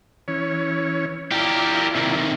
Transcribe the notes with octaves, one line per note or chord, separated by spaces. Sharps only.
E3 C#4 C#5
E4 F4 G4 A#4 D5
C3 D#3